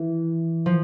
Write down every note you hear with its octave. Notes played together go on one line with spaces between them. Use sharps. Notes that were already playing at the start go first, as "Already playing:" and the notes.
Already playing: E3
F3